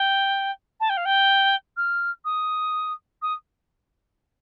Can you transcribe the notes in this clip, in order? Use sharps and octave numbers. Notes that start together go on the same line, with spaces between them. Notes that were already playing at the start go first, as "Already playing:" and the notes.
Already playing: G5
A5
G5
F5
G5
F6
D#6
D#6